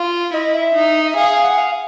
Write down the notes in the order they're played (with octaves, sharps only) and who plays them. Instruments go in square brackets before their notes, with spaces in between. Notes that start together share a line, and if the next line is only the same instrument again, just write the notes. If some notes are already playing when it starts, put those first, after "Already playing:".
Already playing: [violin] F4
[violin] E4 [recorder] D#5
[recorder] E5
[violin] D#4
[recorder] E5
[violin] G#4 [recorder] F5
[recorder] F5
F#5
F5